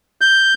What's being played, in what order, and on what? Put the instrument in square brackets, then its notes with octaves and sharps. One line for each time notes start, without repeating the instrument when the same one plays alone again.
[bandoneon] G6